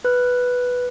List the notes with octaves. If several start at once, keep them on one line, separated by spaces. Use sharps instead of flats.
B4 F#6